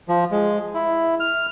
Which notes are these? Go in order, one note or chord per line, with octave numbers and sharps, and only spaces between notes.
F3
G#3
E4
F6